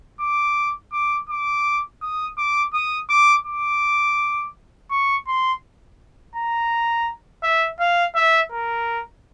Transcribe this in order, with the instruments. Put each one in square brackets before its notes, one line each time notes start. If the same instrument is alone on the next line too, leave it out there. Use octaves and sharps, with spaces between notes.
[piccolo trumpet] D6
D6
D6
D#6
D6
D#6
D6
D6
C#6
C6
A#5
E5
F5
E5
A#4